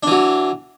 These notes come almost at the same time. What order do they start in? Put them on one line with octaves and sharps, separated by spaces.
D4 E3 F#3